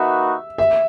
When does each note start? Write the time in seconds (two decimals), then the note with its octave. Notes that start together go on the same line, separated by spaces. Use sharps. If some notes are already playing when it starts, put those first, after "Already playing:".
Already playing: A#3 D#4 F#4 B4 E5
0.58 E5